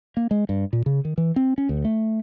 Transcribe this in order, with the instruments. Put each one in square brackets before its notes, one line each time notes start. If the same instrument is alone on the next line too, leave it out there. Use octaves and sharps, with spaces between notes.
[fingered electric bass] A#3
G#3
G2
A#2
C#3
D#3
E3
C4
C#4
D2
A3